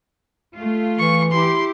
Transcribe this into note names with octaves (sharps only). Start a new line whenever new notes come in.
A3 F4
E3 C#6
E4 G4 C6